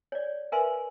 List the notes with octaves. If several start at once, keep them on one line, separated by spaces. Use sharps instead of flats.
C#5 D5
A#4 B4 E5 G#5 C6